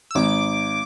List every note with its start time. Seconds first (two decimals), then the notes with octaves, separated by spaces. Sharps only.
0.11 E6
0.15 G#1 D6